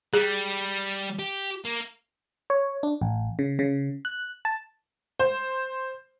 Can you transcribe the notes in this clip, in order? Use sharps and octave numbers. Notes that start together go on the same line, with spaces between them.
G3 G#4
G4
A#3
C#5
D4
A1
C#3
C#3
F#6
A5
C5